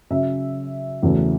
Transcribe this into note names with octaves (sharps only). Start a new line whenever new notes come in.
C#3 F#3 C#4 E5
E2 C#3 F#3 A3